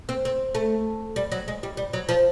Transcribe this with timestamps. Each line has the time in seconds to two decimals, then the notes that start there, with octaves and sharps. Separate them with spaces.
0.09 C4
0.25 C4
0.55 A3
1.16 G3
1.32 F#3
1.48 G#3
1.63 G3
1.77 G3
1.93 F#3
2.09 F3